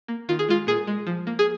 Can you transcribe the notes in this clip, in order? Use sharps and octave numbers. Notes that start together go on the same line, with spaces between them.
A#3
D#3 F4
G#4
G#3 F4
A#2 G#4
G#3
F3
A#3
G#4